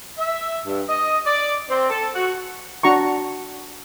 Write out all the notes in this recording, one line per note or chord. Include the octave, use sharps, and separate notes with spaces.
E5
G2
D#5
D5
C4
A4
F#4
D4 F#4 A#5 C#6